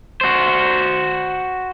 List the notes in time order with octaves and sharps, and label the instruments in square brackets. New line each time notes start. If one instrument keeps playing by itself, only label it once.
[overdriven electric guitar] F#4 C5